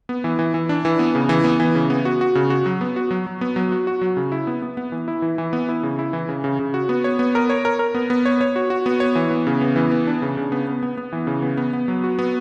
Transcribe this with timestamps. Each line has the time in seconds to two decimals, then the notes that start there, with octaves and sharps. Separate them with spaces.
0.09 B3
0.24 E3
0.39 E3
0.54 E3
0.69 D4
0.85 E3
0.99 B3
1.15 C#3
1.29 E3
1.44 B3
1.60 E3
1.75 C#3
1.90 B3
2.05 F#4
2.21 F#4
2.35 C#3
2.50 F#4
2.66 F#3
2.81 B3
2.96 F#4
3.11 F#3
3.27 F#3
3.41 B3
3.56 F#3
3.72 F#4
3.87 F#4
4.01 F#3
4.17 C#3
4.32 E4
4.47 B3
4.62 B3
4.77 B3
4.92 E3
5.08 E4
5.22 E3
5.38 E3
5.53 B3
5.69 E4
5.83 C#3
5.99 E4
6.13 E3
6.29 C#3
6.44 C#3
6.59 C#3
6.74 F#4
6.89 B3
7.04 C#5
7.19 B3
7.35 A#4
7.50 C#5
7.65 A#4
7.79 A#4
7.95 B3
8.10 B3
8.25 C#5
8.41 C#5
8.56 F#4
8.70 F#4
8.86 B3
9.00 C#5
9.15 E3
9.31 B3
9.47 C#3
9.61 B3
9.76 E3
9.91 B3
10.07 D4
10.22 C#3
10.37 C#3
10.52 B3
10.67 B3
10.83 B3
10.97 B3
11.13 E3
11.27 C#3
11.42 B3
11.57 B3
11.73 B3
11.88 F#3
12.04 F#4
12.19 B3